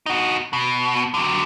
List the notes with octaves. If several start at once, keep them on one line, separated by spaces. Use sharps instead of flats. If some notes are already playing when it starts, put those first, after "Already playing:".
D#4 F#4
B2
D3 F#3